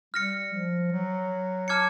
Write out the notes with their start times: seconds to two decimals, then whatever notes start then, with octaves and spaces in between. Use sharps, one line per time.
0.14 G3 F6 A#6 C#7
0.53 F3
0.92 F#3
1.68 A5 D6 F6 G#6 C#7